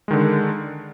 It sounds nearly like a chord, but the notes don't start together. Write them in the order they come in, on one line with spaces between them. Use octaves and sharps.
G#3 D#3 D3